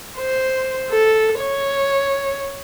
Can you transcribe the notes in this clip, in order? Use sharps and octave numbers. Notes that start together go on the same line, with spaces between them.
C5
A4
C#5